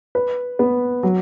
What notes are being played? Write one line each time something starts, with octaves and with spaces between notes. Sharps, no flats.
B4
B3
F#3